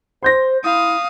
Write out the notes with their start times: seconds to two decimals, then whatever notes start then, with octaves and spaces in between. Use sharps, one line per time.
0.23 C5 C6 G6 A#6
0.63 E4 F5 D#6